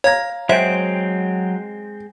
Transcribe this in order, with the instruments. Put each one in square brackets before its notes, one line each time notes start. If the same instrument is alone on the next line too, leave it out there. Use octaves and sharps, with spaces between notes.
[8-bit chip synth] C#5 G#6 [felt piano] F5 A#5 A#6
[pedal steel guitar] F#3 G5 [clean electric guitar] G#3 C4 [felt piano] C5 [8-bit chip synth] E5